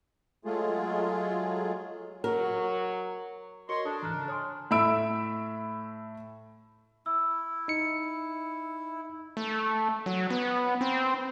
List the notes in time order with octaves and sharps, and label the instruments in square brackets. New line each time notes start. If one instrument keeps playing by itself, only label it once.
[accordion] F#3 G#3 A3 F4 G#4
[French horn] F#3 [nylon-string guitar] A#4
[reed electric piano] F#4 A#4 [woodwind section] C#5 D#5 C6 [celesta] C#6 C#7
[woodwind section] D4 [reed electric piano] A4 [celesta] D#6
[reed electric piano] D2 G#2 E3 [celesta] A#5 F6 F#6
[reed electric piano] C#3
[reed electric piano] C#5 C6 [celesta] G#5 D#6 F6
[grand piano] A2 E5 B5 E6 D7
[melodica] E4 [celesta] E6
[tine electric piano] D#4 C#7
[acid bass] A3
F#3
B3
C4